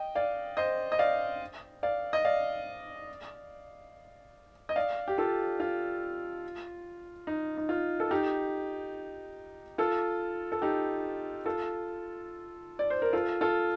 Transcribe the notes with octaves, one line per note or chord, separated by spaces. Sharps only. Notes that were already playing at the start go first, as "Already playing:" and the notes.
Already playing: D#5 G5
D5 F5
C5 D#5
D#5
D5 F5
D5 F5
D#5
D5 F5
D#5
D5 F5
G4
F4 A4
F4
D#4
D#4
F4
A4
D#4 G4
F4 A4
A4
D#4 G4
F4 A4
D5
C5
A#4
F4 A4
F4 A4